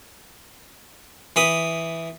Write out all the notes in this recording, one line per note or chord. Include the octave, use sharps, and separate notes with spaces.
E3 B5 D#6